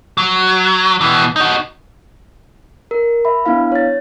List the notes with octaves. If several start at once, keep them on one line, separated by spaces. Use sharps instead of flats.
F#3
B2 E3
D#4 F#4
A#4
E5 B5
B3 D4 E4 F5
C#5 A6